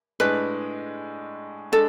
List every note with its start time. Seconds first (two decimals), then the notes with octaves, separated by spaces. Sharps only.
0.20 A2 G#3 D4 B4
1.72 G#3 D4 A4